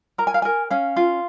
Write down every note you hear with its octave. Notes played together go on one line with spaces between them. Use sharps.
A#4 A#5
G#5
F5
A#4 G#5
C#4 F5
F4